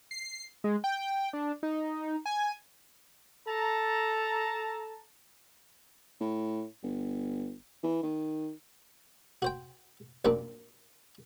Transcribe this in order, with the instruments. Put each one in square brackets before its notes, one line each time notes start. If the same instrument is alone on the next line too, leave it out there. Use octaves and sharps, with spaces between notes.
[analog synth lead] C7
G#3
G5
D4
D#4
G#5
[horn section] A4 A5 A#5
[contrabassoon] A2
G1
E3
D#3
[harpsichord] F#4 C5 G5
A#1 F#2 A#2 A#3 C4 D4